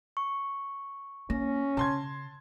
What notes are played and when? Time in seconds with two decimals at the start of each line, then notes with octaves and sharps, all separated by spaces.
0.17 C#6
1.30 A#3 C#4 A#6
1.77 C#3 A5 C6 G#6